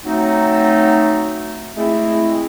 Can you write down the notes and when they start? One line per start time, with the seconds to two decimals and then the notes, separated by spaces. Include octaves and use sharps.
0.05 F#3 A3 C4 D#4
1.76 G#3 A3 C4 E4